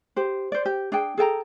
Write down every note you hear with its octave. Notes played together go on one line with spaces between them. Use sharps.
G4 C5
C5 D5
G4
D4 G#4 G5
G#4 A4 G5 A#5